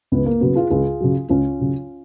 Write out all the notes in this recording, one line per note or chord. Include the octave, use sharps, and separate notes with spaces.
C#2 B3
A#3
C#3 F#3 B3
F4 G#4
C#2 F4 G#4
C#3 F#3
C#2 C#4 F4
C#3 F#3